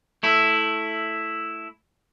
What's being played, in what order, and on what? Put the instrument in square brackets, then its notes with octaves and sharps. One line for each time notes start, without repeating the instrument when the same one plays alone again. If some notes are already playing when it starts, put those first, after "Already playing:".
[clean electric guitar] A3 E4